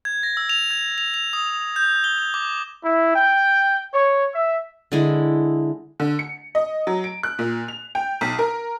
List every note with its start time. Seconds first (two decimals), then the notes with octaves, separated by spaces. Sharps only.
0.05 G#6
0.23 A#6
0.37 E6
0.49 F7
0.71 G#6
0.98 F7
1.14 F7
1.33 D#6
1.76 G6
2.04 G7
2.19 F7
2.34 D6
2.84 E4
3.15 G5
3.94 C#5
4.35 E5
4.92 D3 G#3 E4
6.00 D3
6.19 C#7
6.55 D#5
6.87 F#3
7.04 D7
7.23 F#6
7.39 A#2
7.68 F7
7.95 G5
8.21 B1
8.39 A#4